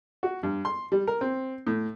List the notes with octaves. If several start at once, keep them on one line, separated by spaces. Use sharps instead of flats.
F#4
G2
C6
G3
A#4
C4
A2